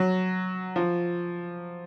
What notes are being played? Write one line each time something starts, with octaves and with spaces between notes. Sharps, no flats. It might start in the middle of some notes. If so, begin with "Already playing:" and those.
Already playing: F#3
F3